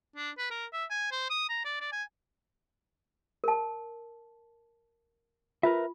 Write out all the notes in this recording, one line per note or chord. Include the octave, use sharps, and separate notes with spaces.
D4
B4
A#4
E5
G#5
C5
D#6
A#5
D5
D5
G#5
A#4 A5
F4 A#4 B4 E5